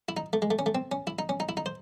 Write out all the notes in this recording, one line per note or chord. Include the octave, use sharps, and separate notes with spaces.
E4
D#4
A3
G#3
A3
C#4
A3
C4
C#4
E4
D#4
C#4
D#4
E4
D#4
C5